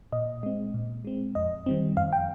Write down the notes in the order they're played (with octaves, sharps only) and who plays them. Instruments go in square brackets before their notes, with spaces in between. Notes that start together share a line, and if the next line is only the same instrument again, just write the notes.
[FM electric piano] A#2 D#5
G#3 C4
A#2
G#3 C4
F2 D#5
D#3 G3 C4
F2 F5
G5